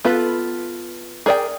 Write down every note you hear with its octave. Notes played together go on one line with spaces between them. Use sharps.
B3 F4 A4 B4
G#4 A#4 D5 F5 G5